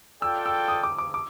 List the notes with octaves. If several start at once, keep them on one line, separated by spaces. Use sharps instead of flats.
F4 A4 D5 G5 E6
E6
D#6
D6
D6
D6